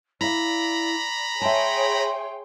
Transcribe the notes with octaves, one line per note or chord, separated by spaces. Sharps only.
E4 D5 F5 A#5 B5
G#4 C#5 E5 G5 A5 C6